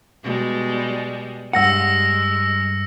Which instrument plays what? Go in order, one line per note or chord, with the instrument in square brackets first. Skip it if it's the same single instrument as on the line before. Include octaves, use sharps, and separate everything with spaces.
[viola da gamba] B2 G3 G#3
[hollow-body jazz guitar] G2 F#5 [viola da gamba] G#3 [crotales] E6 A#6 C#7